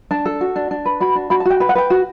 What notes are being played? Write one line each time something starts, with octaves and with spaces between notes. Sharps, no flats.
D4 A5
A4
F#4
D4
D4
B4
F#4 B5
D4
F#4 B5
A5
F#4 G5
B4 G5
F#5
B4 G5
F#4